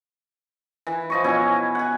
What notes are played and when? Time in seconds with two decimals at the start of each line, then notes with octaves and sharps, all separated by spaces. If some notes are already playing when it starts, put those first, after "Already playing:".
0.87 E3
1.10 F3 D#5 C#6
1.24 B2 C#4 E4 G#5
1.75 F#5 G#5